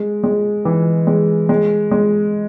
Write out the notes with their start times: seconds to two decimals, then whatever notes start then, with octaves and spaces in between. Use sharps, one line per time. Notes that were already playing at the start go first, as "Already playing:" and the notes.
Already playing: G#3
0.24 G#3
0.65 E3
1.07 G#3
1.49 G#3
1.91 G#3